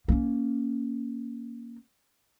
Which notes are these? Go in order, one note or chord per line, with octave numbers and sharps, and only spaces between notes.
A#3 C#4